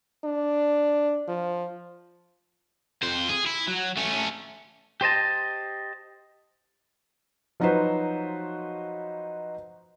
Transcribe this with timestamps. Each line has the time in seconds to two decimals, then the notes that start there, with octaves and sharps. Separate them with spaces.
0.25 D4
1.28 F3
3.03 F2 C5
3.29 G#4
3.47 E4
3.68 F#3
3.97 A3 C#4
5.01 G4 C5 D#5 A5
7.60 F3 F#3 D#4 F#4 B4 C5